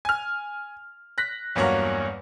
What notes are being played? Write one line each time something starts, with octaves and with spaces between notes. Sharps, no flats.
G#5 F6
F#6 A#6 B6
E2 G2 F#3 A#3 C#5 F#5